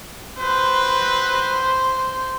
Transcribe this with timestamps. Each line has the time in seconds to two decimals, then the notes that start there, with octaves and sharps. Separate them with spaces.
0.39 C4 F#4 B4 C5